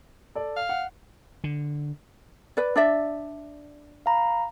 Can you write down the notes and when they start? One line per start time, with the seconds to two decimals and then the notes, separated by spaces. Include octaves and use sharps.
0.35 A4 D5
0.56 F5
0.69 F#5
1.44 D3
2.57 B4 D5
2.76 D4 D5 E5
4.06 F5 A#5 B5